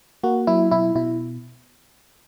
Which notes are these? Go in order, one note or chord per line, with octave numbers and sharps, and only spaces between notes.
A#3 F#4
F#3 E4
B2 E4
B2 E4